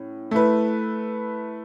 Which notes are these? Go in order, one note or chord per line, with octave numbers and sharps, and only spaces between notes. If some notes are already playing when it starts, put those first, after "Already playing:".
Already playing: A2 C#4
A3 E4 B4